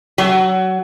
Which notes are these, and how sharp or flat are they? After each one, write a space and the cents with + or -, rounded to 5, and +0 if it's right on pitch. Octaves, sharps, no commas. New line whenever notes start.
F#3 +20